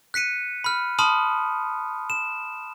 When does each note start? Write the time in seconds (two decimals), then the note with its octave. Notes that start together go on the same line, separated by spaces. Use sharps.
0.14 F#6 B6 C#7 D#7
0.64 B5 F6
0.99 A5 B5 C6 D#6 F6
2.10 E7